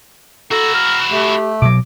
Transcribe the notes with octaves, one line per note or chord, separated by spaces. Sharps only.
E4 F#4 A4 A#5
F6
A3 G4
B2 F#3 D6